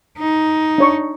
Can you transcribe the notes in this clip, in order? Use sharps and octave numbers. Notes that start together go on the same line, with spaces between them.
D#4
D4 C#5 C#6